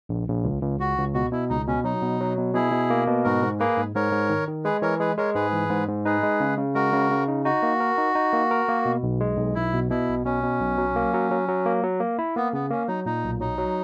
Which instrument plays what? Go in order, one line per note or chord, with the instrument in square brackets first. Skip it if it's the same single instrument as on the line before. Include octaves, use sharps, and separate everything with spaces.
[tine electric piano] A#1
A#1
C#2
C#2
[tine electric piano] C#2 [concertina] F#4
[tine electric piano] C#2
[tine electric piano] B2 [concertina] F#4
[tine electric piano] B2 [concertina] E4
[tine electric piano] C#2 [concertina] D#4
[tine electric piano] B2 [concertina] C#4
[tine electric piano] F#3 [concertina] D#4
[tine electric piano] B2
F#3
B2
[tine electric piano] B2 [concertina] E4 G#4
[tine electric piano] B2
A#3
B2
[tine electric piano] G#2 [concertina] F#4 A#4
[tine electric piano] G#2
[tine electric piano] A#3 [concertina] G#4 B4
[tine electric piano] G#2
[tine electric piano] G#2 [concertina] A#4 C#5
[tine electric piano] G#2
D#3
D#3
[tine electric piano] G#3 [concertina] G#4 B4
[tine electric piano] E3 [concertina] A#4 C#5
[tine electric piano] G#3 [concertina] G#4 B4
[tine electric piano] G#3 [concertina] A#4 C#5
[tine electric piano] G#2 [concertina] G#4 B4
[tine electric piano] E3
G#2
G#2
[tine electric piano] D#4 [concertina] G#4 B4
[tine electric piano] G#3
C#3
C#3
[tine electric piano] G#3 [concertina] F#4 A#4
[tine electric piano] C#3
C#3
D#4
[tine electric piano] D#4 [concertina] F#4
[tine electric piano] A#3
A#4
D#4
D#4
A#3
A#4
A#3
B2
B1
G#3
B1
[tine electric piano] B1 [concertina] E4
[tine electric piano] B2
[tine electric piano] B2 [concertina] E4
[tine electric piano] B1
[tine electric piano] B2 [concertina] C#4
[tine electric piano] B2
B1
F#3
A#3
F#3
F#3
F#3
A#3
F#3
A#3
E4
[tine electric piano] A#3 [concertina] B3
[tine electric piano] C#3 [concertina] B3
[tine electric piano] A#3 [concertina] C#4
[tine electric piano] F#3 [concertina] D#4
[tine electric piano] A#2 [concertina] D#4
[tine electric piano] B1
[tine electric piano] F#3 [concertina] D#4
[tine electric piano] F#3